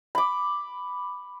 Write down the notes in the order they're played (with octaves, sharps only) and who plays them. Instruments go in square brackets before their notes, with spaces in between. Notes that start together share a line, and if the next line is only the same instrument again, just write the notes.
[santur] B5 D6